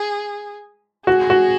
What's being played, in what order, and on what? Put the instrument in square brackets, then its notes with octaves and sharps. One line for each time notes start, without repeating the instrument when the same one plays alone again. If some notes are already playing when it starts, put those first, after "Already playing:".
Already playing: [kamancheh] G#4
[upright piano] F#4 [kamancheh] G#4
[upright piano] F#4